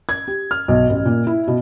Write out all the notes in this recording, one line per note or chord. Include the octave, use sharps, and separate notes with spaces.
G#6
G4
F6
B1
A1
A#2
E4
B2